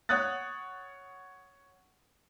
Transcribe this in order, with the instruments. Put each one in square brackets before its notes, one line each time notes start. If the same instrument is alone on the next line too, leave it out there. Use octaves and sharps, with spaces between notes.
[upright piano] C#5 F#5 D#6 F#6 A6